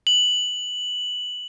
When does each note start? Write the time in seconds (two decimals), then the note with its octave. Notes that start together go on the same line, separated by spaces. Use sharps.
0.07 F#7